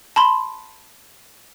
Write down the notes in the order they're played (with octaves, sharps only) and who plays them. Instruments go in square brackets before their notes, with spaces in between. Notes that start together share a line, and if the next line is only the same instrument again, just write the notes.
[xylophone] A5 B5 C6